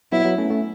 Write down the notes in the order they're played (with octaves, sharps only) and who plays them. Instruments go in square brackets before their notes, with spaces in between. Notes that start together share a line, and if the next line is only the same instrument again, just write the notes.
[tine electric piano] F#3 B3 [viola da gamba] E4
[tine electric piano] F#3 B3
A3 C#4
A3 C#4